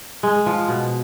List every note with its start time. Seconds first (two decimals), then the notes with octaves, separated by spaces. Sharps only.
0.23 G#3
0.46 F3
0.68 B2